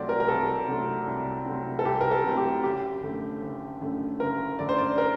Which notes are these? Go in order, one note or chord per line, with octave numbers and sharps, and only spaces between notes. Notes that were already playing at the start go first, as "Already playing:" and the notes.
Already playing: C2 C3 F#3 A3 C4 D5
A#4
A#4
C2 A4
C3 F#3 A3 C4
C2
C3 F#3 A3 C4
A4
C2 G4
A#4
A4
C3 F#3 A3 C4
G4
F#1 G4
F#2 D3 A3
F#1
F#2 D3 A3
F#1 A#4
F#2 D3 A3 D5
C5
D5
A#4